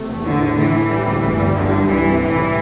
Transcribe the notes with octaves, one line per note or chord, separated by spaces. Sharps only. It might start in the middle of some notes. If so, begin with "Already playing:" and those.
Already playing: C3 A3
E2
A2 D3
A2
A2 E3
A2
G3
D2
G1
G3
G2 D3
G2
C2 E3
C3
A2 E3
G3